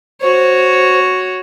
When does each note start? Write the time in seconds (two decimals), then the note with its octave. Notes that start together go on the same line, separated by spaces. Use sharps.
0.21 F#4 C5 C#5